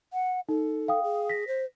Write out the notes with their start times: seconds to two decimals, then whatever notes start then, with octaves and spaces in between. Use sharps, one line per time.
0.13 F#5
0.49 D#4 A4
0.88 F5 G5 D#6
1.03 G#4
1.29 A#6 B6
1.48 C5